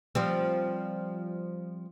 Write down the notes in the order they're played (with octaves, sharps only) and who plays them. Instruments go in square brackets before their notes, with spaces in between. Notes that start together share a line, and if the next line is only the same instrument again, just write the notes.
[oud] F3 G3 C4